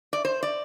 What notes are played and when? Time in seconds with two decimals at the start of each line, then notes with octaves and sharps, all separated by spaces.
0.13 D5
0.25 C5
0.43 D5